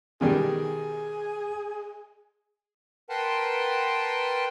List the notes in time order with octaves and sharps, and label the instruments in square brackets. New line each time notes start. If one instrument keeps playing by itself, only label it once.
[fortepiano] B2 D#3 G3 [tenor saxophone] G#4
[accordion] A#4 B4 F#5 G5 A5 C6